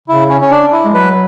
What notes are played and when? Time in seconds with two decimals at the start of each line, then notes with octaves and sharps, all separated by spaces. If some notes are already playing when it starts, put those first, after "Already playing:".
0.08 C#3 E4
0.29 C#4
0.41 C#4
0.51 D4
0.73 E4
0.85 G#3
0.93 F#3 B4